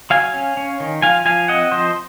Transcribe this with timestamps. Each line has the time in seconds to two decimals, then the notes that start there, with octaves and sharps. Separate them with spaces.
0.10 F#3 F5 G#5
0.34 C#4
0.57 C#4
0.80 D#3
1.02 F3 F5 G#5
1.25 F3 F5 G#5
1.48 C4 D#5 F#5
1.72 F3 C5 D#5